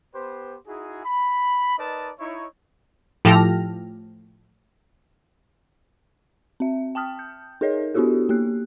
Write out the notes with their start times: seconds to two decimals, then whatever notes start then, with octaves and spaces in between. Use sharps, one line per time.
0.14 B3 G4 B4 C5
0.67 D#4 E4 F#4 G#4
1.05 B5
1.78 D#4 A#4 B4 D5 D#5 A5
2.19 D#4 E4 C#5
3.25 A2 F3 G4 A4 F6 A#6
6.60 C4 E5
6.95 G5 A5 D#6 F6
7.19 G6
7.61 D#4 G#4 A#4 C#5 D#5
7.94 B3 D4 E4 F#4 G4 A4
8.29 A#3 G4 F#6